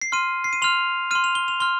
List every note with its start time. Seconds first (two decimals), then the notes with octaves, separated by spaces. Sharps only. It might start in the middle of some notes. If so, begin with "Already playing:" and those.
0.02 C7
0.12 C6 F6 D#7
0.44 C7
0.53 D#7
0.62 C6 F6 F7
1.11 F6 D#7
1.15 C6
1.24 F7
1.35 G7
1.48 F7
1.60 C6 F6 G7